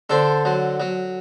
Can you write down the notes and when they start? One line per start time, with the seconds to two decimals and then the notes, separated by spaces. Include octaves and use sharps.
0.10 D3 A4 C5
0.45 F#3
0.80 F#3